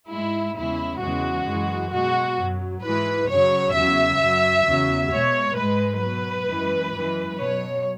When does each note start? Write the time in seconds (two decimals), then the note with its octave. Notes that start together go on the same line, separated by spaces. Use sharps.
0.09 G#2 G#3 E4
0.55 E2 C#3 G#3 E4
1.00 E2 C#3 E3 G#3 F#4
1.46 F#2 E3 G#3
1.92 B2 G#3 F#4
2.37 F#2 F#3
2.82 G#2 E3 G#3 B4
3.28 F#2 C#3 F#3 C#5
3.73 E2 C#3 F#3 E5
4.19 F#2 F#3
4.65 E2 C#3 F#3
5.10 B2 G#3 C#5
5.55 G#2 G#3 B4
6.01 B2 F#3 B4
6.47 F#2 E3 G#3
6.92 F#2 E3 G#3
7.38 B2 F#3 C#5